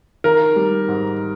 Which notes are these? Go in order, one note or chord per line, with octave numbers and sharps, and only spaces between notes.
D#3 A#4
G3
G#2